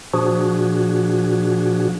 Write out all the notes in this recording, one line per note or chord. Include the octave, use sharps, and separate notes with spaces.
A#2 F3 D4 F#4 G#4